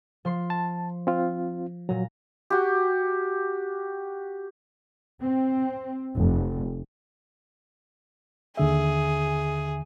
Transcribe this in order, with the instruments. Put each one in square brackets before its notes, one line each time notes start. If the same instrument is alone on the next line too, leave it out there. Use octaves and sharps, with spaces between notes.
[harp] F3 C6 C7
[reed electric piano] A5
C4 F4
[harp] A#2 A#5 [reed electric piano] F#3
[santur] F#4 G4
[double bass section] C4
F1
[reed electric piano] D#2 D3 E5 [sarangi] G#4